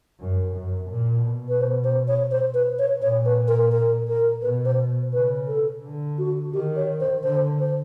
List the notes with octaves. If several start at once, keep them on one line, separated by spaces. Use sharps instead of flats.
F#2
F#2
A#2
B2
B4
C5
C5
C#5
C5
B4
C#5
A#2 C#5
B4
A#4
A#4
A#4
B2 B4
C5
C#3 B4
A4
D3
F#4
D#3 G4
C#5
C5
D3 C5
C5